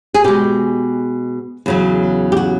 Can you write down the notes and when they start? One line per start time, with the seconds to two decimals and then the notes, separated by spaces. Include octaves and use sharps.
0.14 G#4
0.24 B2 G#3 G4
1.66 E2 C#3 F#3
2.32 G4
2.37 F#4